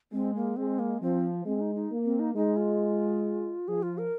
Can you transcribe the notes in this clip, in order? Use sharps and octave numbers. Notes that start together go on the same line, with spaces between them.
G#3 C4
A#3
G#3 C4
A#3
F3 C4
G#3 C4
D#4
D#4
A#3
C4
D#4
G#3 D#4
F4
F3 G#4
F4
A#4